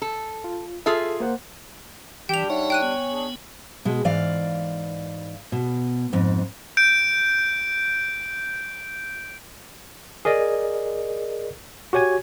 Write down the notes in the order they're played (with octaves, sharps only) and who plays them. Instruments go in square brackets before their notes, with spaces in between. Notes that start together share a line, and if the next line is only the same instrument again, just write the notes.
[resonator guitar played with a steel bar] A4
[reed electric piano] F4
[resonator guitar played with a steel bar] F4 G#4 E5 [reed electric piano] A4
[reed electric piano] A#3 C5 F#5
[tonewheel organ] E3 [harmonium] G3 D4 [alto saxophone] G4 [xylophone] G5 F7
[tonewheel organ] D#4 E5 F#5 [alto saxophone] C#5
[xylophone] G5 F#6 D#7
[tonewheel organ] B3 G#5
[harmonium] D4 G#4
[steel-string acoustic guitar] B2 G#3
G#2 E3 D5 F5
B2
F2 G#2
[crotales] G6 D7
[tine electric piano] G#4 A#4 D5 D#5
F#4 G4 C#5 G#5 G#6